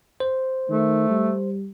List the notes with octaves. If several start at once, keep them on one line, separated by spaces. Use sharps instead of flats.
C5
D#3 A3
G3